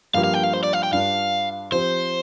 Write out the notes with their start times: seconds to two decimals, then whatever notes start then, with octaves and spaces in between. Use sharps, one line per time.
0.14 G2 F3 A#3 G4 F5
0.24 F5
0.34 G5
0.43 F5
0.53 C5
0.63 D5
0.73 F5
0.83 G5
0.93 G2 G3 D4 F4 F5
1.72 F3 C4 G4 C5